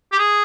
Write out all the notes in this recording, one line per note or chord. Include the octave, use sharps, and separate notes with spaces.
G4
G#4